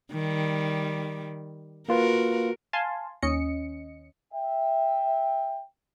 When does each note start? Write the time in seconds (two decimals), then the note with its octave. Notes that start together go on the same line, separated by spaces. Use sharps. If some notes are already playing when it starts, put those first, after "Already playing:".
0.12 D#3 G3
1.89 A#3 F4 F#4 A#4 B4
2.73 F5 G#5 A5 C6
3.22 D#2 C#4 D#5 C#7
4.34 E5 G5